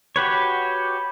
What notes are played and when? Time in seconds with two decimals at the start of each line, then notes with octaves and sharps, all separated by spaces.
0.16 F#4 G4 B4 C#5